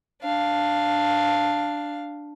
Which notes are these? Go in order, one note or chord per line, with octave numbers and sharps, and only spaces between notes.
D4 F5